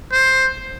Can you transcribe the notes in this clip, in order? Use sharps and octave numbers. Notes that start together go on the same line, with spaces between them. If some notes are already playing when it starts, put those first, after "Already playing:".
C5